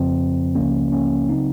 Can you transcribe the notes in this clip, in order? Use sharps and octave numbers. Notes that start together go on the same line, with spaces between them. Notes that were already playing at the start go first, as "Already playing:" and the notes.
Already playing: F2 C#3 F3 C4
C#2 C#3 F3 A#3 C#4
A#3 C#4
C#3 F#3 C4 D#4